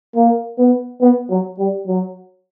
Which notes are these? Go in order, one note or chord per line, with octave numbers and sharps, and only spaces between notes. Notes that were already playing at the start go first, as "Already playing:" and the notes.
A#3
B3
B3
F#3
G3
F#3